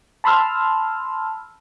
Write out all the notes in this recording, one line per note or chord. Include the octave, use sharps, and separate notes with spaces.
A5 B5 C6 E6 F6